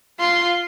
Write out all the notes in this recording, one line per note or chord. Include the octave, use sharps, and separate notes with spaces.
F4 C6